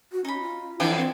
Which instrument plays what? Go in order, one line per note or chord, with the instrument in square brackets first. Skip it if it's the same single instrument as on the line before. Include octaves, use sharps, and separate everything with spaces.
[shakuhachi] F#4
[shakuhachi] C#4 [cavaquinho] D#4 B5
[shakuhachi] F4
[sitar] F2 E3 D4 [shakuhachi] E4 [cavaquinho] G5 D#6
[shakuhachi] C4